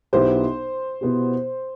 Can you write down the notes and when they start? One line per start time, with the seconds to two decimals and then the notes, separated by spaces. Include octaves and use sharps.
0.13 B1 B2 B3 E4 G4 C5
1.01 B2 B3 E4 G4